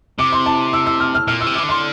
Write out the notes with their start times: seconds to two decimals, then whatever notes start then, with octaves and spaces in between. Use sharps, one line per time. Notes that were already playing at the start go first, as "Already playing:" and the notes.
0.19 C3 D6
0.32 C6
0.46 A5
0.73 E6
0.86 E6
1.00 F6
1.15 F6
1.27 A#2 F6
1.41 E6
1.47 C3
1.55 E3 D6
1.64 D3
1.69 C6